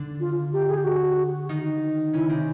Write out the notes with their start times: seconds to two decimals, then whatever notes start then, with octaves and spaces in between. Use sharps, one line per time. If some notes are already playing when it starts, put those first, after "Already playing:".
Already playing: D3 D4
0.20 F4
0.53 G4
0.69 G#4
0.77 G4
0.84 F#4
1.49 D#3 D#4
2.13 C#3 C#4 E4
2.29 C3 C4